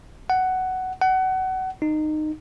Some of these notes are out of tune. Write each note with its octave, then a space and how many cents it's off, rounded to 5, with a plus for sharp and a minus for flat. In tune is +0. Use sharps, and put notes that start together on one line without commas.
F#5 +10
F#5 +25
D#4 -20